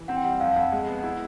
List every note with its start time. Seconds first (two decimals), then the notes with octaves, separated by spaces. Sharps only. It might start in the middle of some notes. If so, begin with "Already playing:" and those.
Already playing: E3
0.08 C4 F#5
0.17 G5
0.24 G3 F#5
0.40 F2 F5
0.51 F5
0.56 F2 F#5
0.72 G#3
0.88 B3
1.03 E4